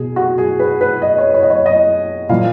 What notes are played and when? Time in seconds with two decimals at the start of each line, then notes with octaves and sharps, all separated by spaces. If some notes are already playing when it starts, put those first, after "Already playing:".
Already playing: B2 G#4
0.16 F#4
0.38 G#4
0.60 B4
0.81 B4
1.02 D#5
1.18 C#5
1.34 C#5
1.43 D#5
1.50 C#5
1.66 D#5
2.29 A#2 F3 F5